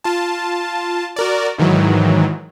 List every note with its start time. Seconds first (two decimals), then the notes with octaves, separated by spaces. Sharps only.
0.04 F4 A5
1.16 F#4 A#4 D5
1.58 G#2 D#3 E3 F#3